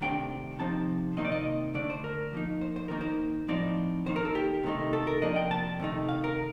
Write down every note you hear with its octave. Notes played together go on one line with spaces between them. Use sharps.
C3 D#3 A3 D4 G5
C3 F3 C4 D#4 A5
C3 D#3 A#3 D#4 D#5
D5
D#5
D3 A3 D4 D5
C5
A#4
F3 A#3 D#4
C5
C5
D#3 A#3 D#4 A#4
C5
A2 F3 C4 D#4 D5
D#3 A#3 D#4 C5
A#4
A4
G4
C3 D#3 A3 D#4
A4
A#4
C3 F3 A#3 D4 D#5
G5
A5
C3 D#3 A3 D#4
F5
A#4